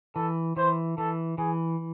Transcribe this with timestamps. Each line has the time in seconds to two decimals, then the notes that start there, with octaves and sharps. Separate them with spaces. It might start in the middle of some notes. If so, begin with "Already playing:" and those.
0.15 E3 A4
0.57 E3 C5
0.98 E3 A4
1.38 E3 G#4